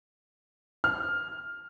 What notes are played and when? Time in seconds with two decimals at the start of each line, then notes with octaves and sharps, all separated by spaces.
0.84 F6